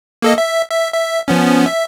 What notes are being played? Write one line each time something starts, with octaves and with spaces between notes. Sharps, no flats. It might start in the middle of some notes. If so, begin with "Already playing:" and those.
A#3 A4 D#5
E5
E5
E5
F3 B3 C#4
E5